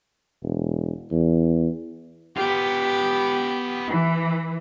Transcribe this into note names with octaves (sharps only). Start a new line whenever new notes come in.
E1
E2
B3 F4 G4
E3